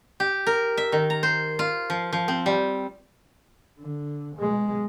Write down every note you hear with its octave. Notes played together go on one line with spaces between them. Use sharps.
G4
A#4
E5
D#3
A#5
C5
F4
F3
F3
C4
G3
D3
B2 G#3